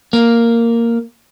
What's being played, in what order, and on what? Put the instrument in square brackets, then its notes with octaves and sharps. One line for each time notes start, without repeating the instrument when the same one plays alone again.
[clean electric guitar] A#3